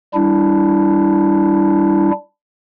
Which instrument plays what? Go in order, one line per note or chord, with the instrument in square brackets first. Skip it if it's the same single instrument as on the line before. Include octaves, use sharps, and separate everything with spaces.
[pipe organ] G3 D4 E4